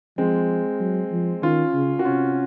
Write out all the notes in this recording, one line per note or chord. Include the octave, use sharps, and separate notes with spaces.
F3 G#3 C4
F#3
F3
D#3 C#4 F4
C#3
F#4
C3 C#4 F4